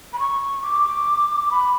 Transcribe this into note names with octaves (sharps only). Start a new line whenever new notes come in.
B5
C#6
D6
B5